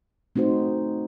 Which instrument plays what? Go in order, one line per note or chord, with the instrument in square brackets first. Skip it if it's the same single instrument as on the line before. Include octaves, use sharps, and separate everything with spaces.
[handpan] A3 C4 D#4 F#4 C5